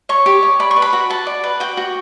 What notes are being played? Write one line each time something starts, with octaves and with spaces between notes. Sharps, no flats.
C#5 C#6
G4
C#5
D5 B5
C#6
B4
B5
F#4
F#4 A5
D5
B4
F#4 G5
F#4